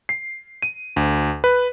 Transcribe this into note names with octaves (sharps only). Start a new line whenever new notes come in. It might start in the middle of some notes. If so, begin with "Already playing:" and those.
C7
D#7
D2
B4